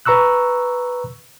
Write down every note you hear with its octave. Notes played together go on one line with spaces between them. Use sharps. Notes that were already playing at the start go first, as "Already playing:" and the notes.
B4 A#5 C#6 E6 F#6